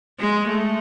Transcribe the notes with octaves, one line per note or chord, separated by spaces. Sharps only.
G#3
A3